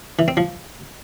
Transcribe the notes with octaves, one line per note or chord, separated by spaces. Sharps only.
E3
C4
F3